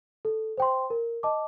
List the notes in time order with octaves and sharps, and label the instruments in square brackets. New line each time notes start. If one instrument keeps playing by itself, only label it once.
[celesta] A4
C5 G5 C6
A#4
D#5 A5 D6